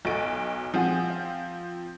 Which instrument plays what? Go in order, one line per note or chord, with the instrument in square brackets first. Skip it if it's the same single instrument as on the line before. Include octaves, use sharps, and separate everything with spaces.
[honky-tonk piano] B1 D7 [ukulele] F#4 A4 D#5
[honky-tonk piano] F3 C4 [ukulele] G#4 F#5 G#5
[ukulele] F5